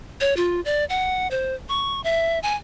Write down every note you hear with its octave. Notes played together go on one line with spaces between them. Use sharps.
C#5
F4
D5
F#5
C5
C#6
E5
G#5